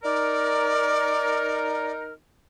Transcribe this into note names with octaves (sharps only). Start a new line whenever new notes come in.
D#4 A#4 D5